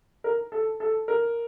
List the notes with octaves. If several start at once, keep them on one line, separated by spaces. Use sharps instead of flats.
A#4
A4
A4
A#4